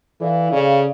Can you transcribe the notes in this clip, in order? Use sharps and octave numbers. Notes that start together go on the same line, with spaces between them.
E3 A4 D5 F5
C#3 A4 D5 F5